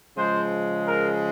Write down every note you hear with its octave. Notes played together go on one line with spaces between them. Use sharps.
C#3 F3 G#3 C5
A#4